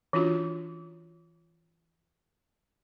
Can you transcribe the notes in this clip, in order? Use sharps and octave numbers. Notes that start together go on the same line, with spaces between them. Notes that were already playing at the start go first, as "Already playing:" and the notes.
E3 C#4 D4 F4 F#4